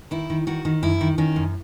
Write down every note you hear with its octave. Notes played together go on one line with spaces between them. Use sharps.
D#3 E4
D#3
D#3 F#4
D#3
F#2 E4
D#3
D#3 C#4
F#2